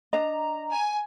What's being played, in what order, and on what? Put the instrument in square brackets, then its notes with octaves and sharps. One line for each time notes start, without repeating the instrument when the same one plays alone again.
[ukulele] D4 D#5 [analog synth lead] A#5
[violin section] G#5